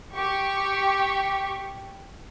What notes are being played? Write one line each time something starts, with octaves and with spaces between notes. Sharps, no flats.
G4 C#6